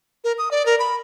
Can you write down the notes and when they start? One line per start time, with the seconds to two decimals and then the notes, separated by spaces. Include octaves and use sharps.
0.24 A#4
0.38 D#6
0.51 D5
0.66 A#4
0.79 B5